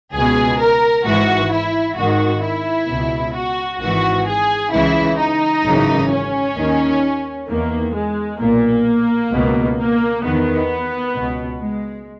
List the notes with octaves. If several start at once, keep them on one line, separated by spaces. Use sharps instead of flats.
C#2 B2 G#4
A#4
G#1 G#2 E3 F#4
E4
G#1 G#2 D#3 F#4
E4
C#2 B2
F#4
G#1 G#2 E3 F#4
G#4
C#2 C#3 E3 E4
D#4
G#1 F#2 C#3 E3
C#4
D#2 D#3
E2 D#3 A#3
G#3
B1 A#2 A#3
C#2 B2
A#3
E2 D#3 B3
C#2 B2
G#3